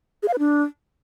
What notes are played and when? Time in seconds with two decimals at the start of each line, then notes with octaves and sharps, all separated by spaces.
0.23 G#4
0.28 F5
0.33 B4
0.39 D4